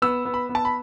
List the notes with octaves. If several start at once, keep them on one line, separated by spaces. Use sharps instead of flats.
B3 E6
B3
B5
B3
A5
B5